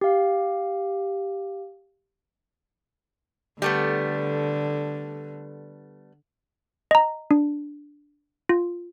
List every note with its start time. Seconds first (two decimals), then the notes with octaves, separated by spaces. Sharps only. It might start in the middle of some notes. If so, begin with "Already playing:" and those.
0.01 G4 F5
3.62 D3 G3 A3 B3
6.91 D#5 A#5
7.31 D4
8.49 F4